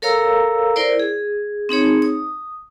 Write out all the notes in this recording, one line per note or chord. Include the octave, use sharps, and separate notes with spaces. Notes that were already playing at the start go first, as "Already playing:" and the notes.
A4 A#4 C#5 F5 A#5 E6
E4 A#4 C5 D5
G#4
C4 D#4 G#4 C#5
D#6